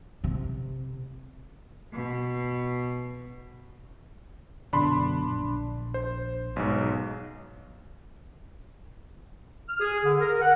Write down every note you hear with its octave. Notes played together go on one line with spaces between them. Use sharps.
C3
B2
F#2 B2 D3 D4 B5 C6
A#1
C5
B1 G#2
F6
G#4
D3
A#4
F#5